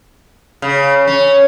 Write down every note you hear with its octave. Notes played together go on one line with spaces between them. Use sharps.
C#3
C#4